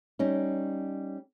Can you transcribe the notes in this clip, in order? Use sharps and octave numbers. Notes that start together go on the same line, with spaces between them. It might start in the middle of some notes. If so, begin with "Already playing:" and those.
G3 C#4 D#4